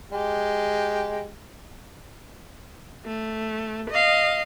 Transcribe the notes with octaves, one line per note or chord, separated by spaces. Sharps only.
G#3 G4
A3
D#5 F5